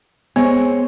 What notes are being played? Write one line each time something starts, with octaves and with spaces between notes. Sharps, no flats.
G#3 B3 C4 C#5